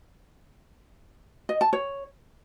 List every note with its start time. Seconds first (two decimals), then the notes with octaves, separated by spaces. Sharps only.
1.49 D#5
1.61 A5
1.73 C#5